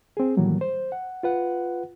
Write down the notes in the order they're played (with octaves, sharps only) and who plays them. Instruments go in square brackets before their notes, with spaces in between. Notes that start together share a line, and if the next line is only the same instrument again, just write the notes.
[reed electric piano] C4 G#4
A2 D#3 E3 F#3 G3 A#3
C5
F#5
F4 B4 F#5